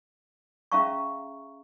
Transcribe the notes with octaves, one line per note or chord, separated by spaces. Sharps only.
C#4 G#4 E5 F5 A#5 C#6